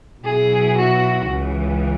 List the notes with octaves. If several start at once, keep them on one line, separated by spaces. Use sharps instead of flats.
B2 F#3 E4 G#4
F#4
C#2 C#3 E3